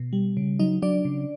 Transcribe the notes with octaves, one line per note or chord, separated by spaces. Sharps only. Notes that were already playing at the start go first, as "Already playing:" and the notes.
Already playing: B2
G3
C#3
F#3 D#4 D#5
F#3 D4 D5
C#3